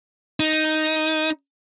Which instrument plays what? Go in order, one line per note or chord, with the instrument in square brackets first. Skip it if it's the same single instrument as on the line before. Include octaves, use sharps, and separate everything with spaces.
[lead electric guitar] D#4